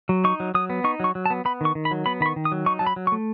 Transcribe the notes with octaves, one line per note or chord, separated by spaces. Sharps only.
F#3
D#4 C#6
F#3
F#3 D#6
B3
D#4 C#6
F#3 C#6
F#3
A5
B3
B3 B5
D#3 C#6
D#3
B5
F#3
B3 B5
D#3 B5
C#6
D#3
D#6
F#3
D#4 C#6
F#3 A5
B5
F#3
C#6
A3